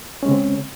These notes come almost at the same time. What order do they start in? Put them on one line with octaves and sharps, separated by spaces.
C#4 G#3 C#3 C4